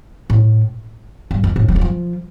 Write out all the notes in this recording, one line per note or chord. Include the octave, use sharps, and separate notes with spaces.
A2
G2
F2
A2
F3
G3
F3